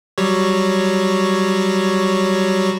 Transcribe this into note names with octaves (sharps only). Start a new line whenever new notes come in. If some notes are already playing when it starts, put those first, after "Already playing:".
F#3 G3 C#5